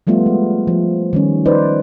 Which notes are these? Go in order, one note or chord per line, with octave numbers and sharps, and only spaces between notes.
F3 G3 A3 B3 F4
G#3
F3
D#3 G3 C#4
D#4 B4 C5 D5